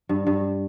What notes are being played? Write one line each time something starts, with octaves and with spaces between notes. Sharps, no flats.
G2
G2